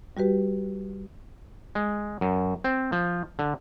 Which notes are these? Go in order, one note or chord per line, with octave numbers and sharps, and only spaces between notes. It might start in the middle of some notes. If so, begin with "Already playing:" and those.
G3 F#4 G4 B4
G#3
F#2
C4
F3
D3